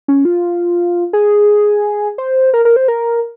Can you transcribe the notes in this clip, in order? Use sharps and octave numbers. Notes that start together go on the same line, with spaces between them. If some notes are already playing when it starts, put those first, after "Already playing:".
C#4
F4
G#4
C5
A#4
A#4
C5
A#4